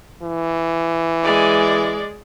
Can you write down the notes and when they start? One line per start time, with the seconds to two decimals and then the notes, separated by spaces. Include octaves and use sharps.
0.23 E3
1.23 G#3 D5